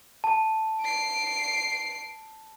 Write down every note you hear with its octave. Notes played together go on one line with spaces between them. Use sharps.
A5
C7 D7